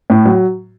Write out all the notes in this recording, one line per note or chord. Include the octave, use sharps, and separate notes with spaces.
A2
F#3